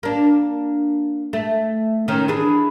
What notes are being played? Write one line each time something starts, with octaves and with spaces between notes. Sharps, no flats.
A#3 D4
A3
D#3 C#4
E3 D4 G#4